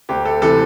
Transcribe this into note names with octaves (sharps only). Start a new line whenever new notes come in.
D2 G4
A4
C3 E3 A4